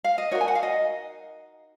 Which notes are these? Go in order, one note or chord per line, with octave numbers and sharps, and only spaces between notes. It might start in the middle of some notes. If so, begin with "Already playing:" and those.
F5
D#5
D#4 F#4 A#4 C#5
G#5
F#5
F5
D#5